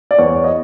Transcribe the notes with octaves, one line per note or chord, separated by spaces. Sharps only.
D5
E2 C#5
D#5